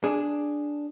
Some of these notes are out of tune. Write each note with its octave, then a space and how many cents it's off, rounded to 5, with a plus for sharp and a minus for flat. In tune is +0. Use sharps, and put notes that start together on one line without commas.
D4 +0 G#4 +0